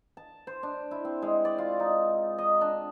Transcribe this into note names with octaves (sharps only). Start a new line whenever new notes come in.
A5
C5
D4
E4
C4
G#3
D5
F4
D#4
D#5
D4